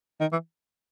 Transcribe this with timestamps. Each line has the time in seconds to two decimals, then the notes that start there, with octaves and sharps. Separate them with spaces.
0.20 D#3
0.32 E3